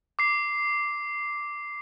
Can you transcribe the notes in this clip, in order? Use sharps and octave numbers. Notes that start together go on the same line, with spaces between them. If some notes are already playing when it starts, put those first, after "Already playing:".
D6 C7